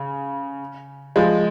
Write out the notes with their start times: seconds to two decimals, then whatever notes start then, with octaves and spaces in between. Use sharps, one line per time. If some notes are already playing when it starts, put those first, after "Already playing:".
Already playing: C#3
1.16 F3 G#3